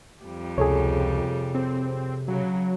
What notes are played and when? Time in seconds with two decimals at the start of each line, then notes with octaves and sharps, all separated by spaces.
0.25 F2 G3
0.58 C#2 C3 G#4 A4 C#5
1.55 C4
2.28 C#3 F#3